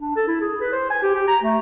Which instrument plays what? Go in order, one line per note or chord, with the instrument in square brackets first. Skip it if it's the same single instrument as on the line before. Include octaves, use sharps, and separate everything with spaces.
[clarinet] D4
A4
E4
G#4
B4
C5
G#5
G4
G4
A#5
A3